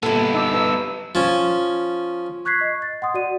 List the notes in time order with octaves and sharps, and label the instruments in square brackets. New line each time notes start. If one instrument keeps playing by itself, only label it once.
[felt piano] A#2 [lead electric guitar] G3 B3 [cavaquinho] E4 A4
[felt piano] D#4 A5 D6 [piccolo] E6
[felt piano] B4 A5
[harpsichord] F3 C#4
[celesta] C#6 F#6 G#6 B6 C7
D#5
A6
F#5 C6 D#6
F#4 D5 D#7